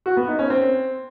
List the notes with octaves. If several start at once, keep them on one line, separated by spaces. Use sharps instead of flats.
F#4
B3
D#4
C#4
C4